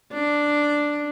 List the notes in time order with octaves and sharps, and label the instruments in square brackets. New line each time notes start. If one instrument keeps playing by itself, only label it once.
[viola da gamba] D4